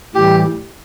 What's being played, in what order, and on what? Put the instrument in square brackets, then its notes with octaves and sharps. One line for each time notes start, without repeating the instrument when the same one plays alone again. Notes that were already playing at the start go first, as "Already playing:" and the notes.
[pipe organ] A2 E3 G3 [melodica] G4